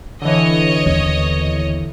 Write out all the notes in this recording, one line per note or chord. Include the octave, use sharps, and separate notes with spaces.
D3 E3 C#5 D#5
D#2 B3